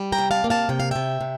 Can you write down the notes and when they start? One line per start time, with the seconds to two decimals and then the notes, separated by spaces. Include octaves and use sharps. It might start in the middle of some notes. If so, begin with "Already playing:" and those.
Already playing: G3
0.12 G5 A#5
0.18 C3
0.31 F5 A5
0.44 A#3
0.50 F5 A5
0.69 C3 G5
0.80 F5
0.91 C3 E5 G5
1.21 C3